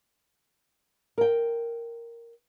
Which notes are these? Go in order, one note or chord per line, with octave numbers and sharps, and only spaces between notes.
A#4 G5